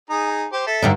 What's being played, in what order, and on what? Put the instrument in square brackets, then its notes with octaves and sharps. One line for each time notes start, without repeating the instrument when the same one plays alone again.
[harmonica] D#4 G#4 A#5
G4 C5
A4 E5
[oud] G2 D3 D#4